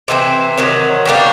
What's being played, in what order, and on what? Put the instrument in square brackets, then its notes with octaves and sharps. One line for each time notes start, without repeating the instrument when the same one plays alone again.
[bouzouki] C3 E3 A3 C4
C3 D#3 F#3
B2 G3 A#3 D4